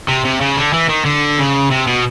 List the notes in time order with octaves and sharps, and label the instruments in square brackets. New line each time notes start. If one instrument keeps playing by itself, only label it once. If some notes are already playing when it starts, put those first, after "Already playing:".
[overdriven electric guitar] C3
C3
C#3
D3
E3
D#3
D3
C#3
C3
B2